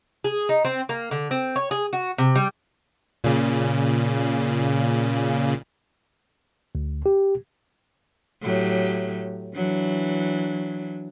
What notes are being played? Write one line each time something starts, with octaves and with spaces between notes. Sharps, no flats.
G#4
D#4
C4
A#3
D3
C4
C#5
G#4
F#4
C3
G3
A#2 C#3
D2
G4
A2 F#3 G4
E3 F#3 D4